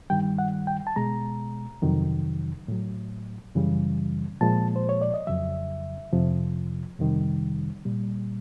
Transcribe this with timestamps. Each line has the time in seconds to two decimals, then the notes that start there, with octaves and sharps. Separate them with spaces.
0.10 G2 D#3 G3 G5
0.38 F#5
0.67 G5
0.87 A5
0.96 B2 G#3 A#5
1.82 F2 C3 D#3 F#3
2.68 A2 F#3
3.55 F#2 C#3 E3 G3
4.41 A#2 F3 G#3 A5
4.76 C5
4.89 C#5
5.02 D5
5.14 D#5
5.27 F2 C#3 F#3 E5
6.13 F2 C3 F3
6.99 F2 C3 D#3 G3
7.85 A#2 G3